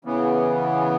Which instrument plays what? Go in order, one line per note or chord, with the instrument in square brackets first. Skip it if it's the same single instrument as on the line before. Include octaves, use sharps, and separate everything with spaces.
[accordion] C#3 E3 B3